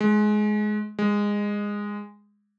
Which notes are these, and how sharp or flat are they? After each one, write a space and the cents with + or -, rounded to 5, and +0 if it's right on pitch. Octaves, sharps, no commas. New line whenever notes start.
G#3 +20
G#3 -15